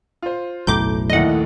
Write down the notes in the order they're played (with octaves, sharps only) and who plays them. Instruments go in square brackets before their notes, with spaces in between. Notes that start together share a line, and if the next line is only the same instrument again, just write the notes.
[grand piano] F4 C5
[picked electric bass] F#1 B1 A2 [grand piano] A#5 [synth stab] D6 G6
[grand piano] A#1 D#2 [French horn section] A3 E4 [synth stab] D#5 F#5